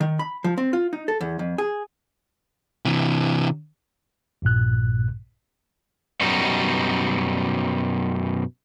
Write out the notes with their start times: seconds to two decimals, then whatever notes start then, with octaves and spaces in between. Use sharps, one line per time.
0.01 D#3
0.19 B5
0.44 F3
0.58 C4
0.73 F4
0.93 D#4
1.08 A4
1.21 E2
1.39 F2
1.58 G#4
2.85 C3 E3
4.42 A#1 G2 A#2 F#6
6.21 F#2 B2 G3 D#4 F#4